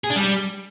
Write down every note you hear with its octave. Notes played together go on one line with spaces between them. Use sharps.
G#4
D4
G3